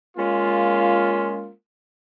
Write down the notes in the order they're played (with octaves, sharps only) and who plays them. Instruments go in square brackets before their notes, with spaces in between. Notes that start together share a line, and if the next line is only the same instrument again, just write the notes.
[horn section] G#3 A#3 C#4 F4